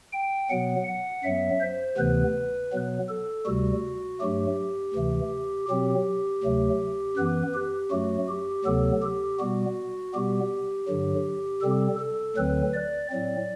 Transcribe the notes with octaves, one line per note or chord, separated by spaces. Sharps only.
G5
B2 F#3 B3 F#5
F#5
F#2 F#3 B3 E5
C5
D2 C3 E3 B3 B4
B2 F#3 B3
A4
D2 C3 G3 F#4
G2 F#3 A3 G4
D2 C3 E3 A3
B2 F#3 C4 G4
D2 C3 F#3 A3
F#2 E3 B3 B4
G4
F#2 F#3 A3 F#4
G4
D2 C3 F#3 B3 A4
G4
B2 G3 B3 F#4
B2 G3 B3 G4
G2 D3 F#3
C3 G3 C4 A4
A4
D2 D3 F#3 C4 B4
D5
A2 F#3 C4 D5